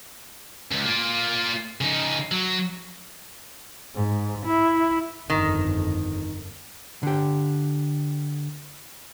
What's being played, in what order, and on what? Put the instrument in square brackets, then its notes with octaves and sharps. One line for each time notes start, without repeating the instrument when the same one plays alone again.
[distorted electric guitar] C#2
A#3 F4
C#3 D#4
F#3
[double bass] G#2
E4
[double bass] G1 F2 [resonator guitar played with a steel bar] D#3
[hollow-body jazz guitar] D3 G4